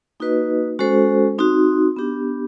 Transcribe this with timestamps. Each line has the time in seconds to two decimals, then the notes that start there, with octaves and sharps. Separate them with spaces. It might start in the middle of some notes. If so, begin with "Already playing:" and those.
0.20 A#3 D#4 F#4 B4 D#5
0.79 G#3 C#4 F#4 A4 C5
1.38 C4 D#4 F#4
1.96 B3 D4 G4